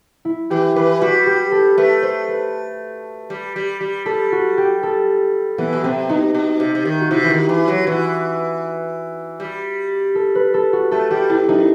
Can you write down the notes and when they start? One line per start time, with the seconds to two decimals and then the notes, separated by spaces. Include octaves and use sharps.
0.25 E4
0.50 E3 G4
0.76 E3 B4
1.02 G3 F#4
1.27 G4
1.52 A4
1.78 A3 B4
2.02 C5
2.28 B4
3.30 G3
3.56 G3
3.81 G3
4.06 G3 A4
4.32 F#4
4.58 G4
4.83 A4
5.58 E3 B3
5.73 B2
5.84 C3 C4
6.09 B2 D#4
6.35 B2
6.60 C3
6.75 C3
6.85 D#3
7.01 F#4
7.11 C3 E4
7.23 E3
7.30 D#3
7.49 E3
7.68 F#3
7.87 E3 F#4
9.40 G3
10.15 A4
10.35 B4
10.54 A4
10.73 F#4
10.91 A3 A4
11.11 G3 G4
11.30 B2 E4
11.48 F#2 D#4